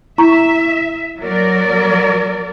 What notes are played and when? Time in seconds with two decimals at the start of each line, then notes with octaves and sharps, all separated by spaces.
0.18 E4 E5 A#5 C#6
1.20 F#3 A#4 D5